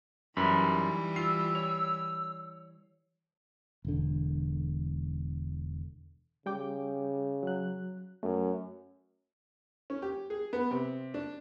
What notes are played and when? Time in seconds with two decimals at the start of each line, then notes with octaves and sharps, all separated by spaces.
0.37 F#2 E3 G3 D#4 B4 B5
1.16 F4 E6 C7
1.55 C#5
3.85 E1 D3
6.46 C#3 G3 G5 D6
7.43 F#3 F#6
8.23 F#2 A3
9.90 C#4
10.02 G4
10.30 G#4
10.53 B3
10.71 C3
11.14 D4